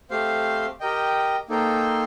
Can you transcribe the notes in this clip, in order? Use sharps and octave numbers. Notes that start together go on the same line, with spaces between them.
A3 C4 G4 C5 F5
G4 A#4 D#5 G5
A#3 D#4 A4 C5 G5